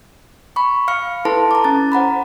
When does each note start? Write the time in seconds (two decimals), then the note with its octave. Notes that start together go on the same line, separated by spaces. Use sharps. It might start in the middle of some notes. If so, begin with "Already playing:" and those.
0.56 B5 C#6
0.88 F5 F6 C#7
1.25 E4 A4 B4 A5 C6
1.51 A#5 D6
1.64 C#4 A6
1.92 C5 F#5 A#5 B5